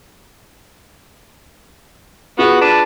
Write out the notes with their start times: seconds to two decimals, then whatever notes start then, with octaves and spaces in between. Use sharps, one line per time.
2.39 B3 F4 F#4 G#4 F#5
2.61 D4 B4 A5